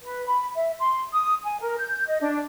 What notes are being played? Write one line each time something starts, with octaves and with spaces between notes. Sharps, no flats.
B4
B5
E5
C6
D#6
G#5
A#4
G6
D#5
D4